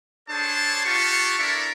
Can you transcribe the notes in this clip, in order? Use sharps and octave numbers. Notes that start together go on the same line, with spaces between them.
D4 G#4 A4 C5 C#5 A5
F4 G4 F#5 A5 C#6
D4 E4 A4 A#4 D5 E5